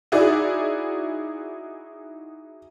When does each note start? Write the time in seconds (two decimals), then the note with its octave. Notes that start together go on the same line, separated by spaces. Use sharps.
0.12 D#4 E4 F#4 G#4 D5